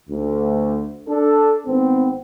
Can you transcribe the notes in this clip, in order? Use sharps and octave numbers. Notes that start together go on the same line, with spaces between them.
D2
D4 A4
G#1 B3 C4